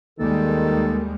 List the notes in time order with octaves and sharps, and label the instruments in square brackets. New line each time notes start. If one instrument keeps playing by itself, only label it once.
[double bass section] D#2 G3 G#3 [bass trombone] D#3 [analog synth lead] A#3 [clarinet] A4